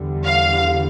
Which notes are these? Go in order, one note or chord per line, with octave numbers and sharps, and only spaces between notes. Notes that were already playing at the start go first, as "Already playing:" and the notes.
Already playing: E2 D3 G3
F5